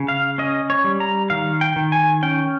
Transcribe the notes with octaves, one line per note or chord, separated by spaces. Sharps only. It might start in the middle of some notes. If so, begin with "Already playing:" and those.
Already playing: C#3
F5
C#4 D#5
C#5
G3
A#5
D#3 F5
G5
D#3
G#5
C#4 G5